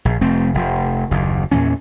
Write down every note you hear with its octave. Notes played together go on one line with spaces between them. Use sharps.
A#1
F1 A3 C4
F1
F#1 D#2
E2 A#2 E3 C#4